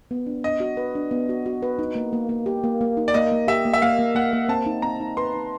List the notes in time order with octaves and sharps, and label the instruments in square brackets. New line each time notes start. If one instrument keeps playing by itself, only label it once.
[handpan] B3
D4
[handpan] D4 [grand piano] D#5
[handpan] F#4
B4
D4
B3
F#4
F#4
B4
D#4
A#3
A#3
A#3
G4
A#3
A#3
D#4
[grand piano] D5
[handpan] A#3 [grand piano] D#5
[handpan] A#3
[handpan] G4 [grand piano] E5
[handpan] A#3
[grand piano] E5
[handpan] A#3 [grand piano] F5
[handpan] A#3
[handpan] A#3 [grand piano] F#5
[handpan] A#3
[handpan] C4 [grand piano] A5
[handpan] D#4
[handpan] C4 [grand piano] A#5
[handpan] D#4
[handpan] B4 [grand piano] C6
[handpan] D#4